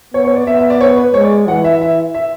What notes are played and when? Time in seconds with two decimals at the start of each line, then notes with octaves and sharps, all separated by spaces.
0.14 B3 C#5
0.24 C#5
0.36 D5
0.47 B3 E5
0.59 E5
0.70 D5
0.81 C#5
0.97 B4
1.14 G#3 C#5
1.25 D5
1.47 E3 F#5
1.64 E5
1.81 E5
2.14 E5